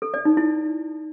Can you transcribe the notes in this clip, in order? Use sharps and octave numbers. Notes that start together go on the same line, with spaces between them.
A4
D5
D#4
E4